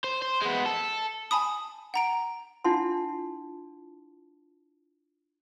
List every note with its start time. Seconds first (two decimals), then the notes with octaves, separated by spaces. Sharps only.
0.04 C5
0.22 C5
0.42 G#3 B3
0.66 A4
1.31 G#5 A5 B5 D#6
1.94 F#5 A#5 D7
2.64 D4 E4 F4 F#5 A5 C6